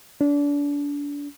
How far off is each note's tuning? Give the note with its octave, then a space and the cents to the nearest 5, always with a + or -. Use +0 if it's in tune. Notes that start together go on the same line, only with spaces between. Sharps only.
D4 -30